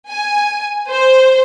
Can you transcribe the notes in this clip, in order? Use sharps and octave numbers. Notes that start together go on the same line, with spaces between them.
G#5
C5